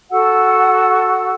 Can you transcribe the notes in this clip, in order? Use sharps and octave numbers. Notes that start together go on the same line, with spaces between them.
F#4 A4 F#5 E6